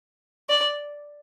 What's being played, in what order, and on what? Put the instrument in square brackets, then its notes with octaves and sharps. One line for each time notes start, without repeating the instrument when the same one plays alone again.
[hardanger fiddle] D5